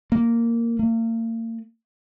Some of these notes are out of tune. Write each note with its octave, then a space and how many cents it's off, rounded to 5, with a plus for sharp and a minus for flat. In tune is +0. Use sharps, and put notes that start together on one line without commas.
A#3 -5
A#3 -40